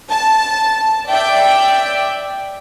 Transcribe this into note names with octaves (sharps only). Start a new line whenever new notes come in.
A5
D5 E5 G5